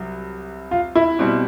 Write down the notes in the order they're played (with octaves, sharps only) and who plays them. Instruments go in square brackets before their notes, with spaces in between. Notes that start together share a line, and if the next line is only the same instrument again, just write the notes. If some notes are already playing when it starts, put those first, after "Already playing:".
Already playing: [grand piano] C2 F#3
[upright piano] F4
E4
[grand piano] B2 G3 C4